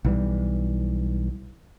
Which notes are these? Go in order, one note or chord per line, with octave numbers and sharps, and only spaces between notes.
B1 E3 G3